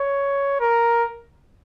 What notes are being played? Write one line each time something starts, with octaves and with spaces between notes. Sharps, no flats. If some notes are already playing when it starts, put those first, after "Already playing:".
Already playing: C#5
A#4